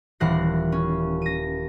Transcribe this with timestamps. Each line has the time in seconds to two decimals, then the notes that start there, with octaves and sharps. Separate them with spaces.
0.20 D#1 E3 F#5 F#6 A#6 C7
0.72 C#4
1.22 A#6 D#7